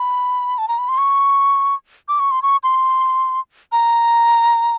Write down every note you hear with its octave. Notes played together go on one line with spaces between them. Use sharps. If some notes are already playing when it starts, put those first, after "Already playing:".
Already playing: B5
A5
A#5
B5
C6
C#6
D6
C#6
C6
C#6
C6
A#5